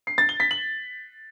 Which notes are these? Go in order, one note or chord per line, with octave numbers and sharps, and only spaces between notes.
C7
A6
G7
B6
F#7